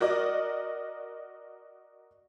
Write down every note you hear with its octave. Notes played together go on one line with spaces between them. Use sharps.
F#4 A#4 D5 D#5